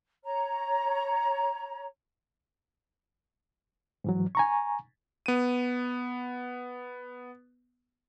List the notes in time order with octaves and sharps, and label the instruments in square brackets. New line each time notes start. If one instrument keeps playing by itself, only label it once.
[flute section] C#5 A#5
[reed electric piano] G#2 E3 F#3
G#5 A#5 C#6
[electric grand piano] B3 D#7